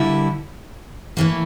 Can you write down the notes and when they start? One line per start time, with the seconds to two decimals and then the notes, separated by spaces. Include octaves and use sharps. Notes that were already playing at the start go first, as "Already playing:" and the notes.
Already playing: D3 G3 A#3 E4
1.17 A2 E3 A#3